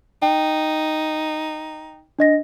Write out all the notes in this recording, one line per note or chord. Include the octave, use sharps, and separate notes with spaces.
D#4 G5
D4 D#5 A#6